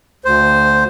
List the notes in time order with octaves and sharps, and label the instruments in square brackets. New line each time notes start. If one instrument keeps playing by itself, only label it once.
[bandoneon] D2 C5